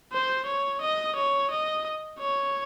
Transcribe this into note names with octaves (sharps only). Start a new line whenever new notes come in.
C5
C#5
D#5
C#5
D#5
C#5